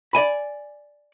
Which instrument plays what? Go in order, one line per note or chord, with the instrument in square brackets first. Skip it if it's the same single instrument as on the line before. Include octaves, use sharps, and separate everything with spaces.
[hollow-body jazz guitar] D5 D#5 G#5 B5